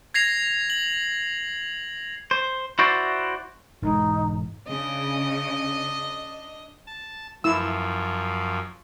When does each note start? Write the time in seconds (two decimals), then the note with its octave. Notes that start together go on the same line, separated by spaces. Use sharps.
0.14 G#6 A#6 C7 F7
0.70 F#7
2.31 C5
2.79 E4 F#4 C5 D5
3.82 E1 G#2 E3 D#4
4.68 C#3 D4 D#5
6.87 A5
7.44 F#2 F3 E4 E6